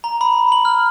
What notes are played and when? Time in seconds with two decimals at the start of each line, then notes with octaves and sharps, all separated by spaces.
0.04 A#5
0.21 B5
0.52 F#7
0.65 F6